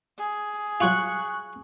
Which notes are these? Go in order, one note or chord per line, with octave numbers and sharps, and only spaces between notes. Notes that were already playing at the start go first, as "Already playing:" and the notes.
G#4
F#3 F4 C#6 F#6